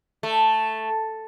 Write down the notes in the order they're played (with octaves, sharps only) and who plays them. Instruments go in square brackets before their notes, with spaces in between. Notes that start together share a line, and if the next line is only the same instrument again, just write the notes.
[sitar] A3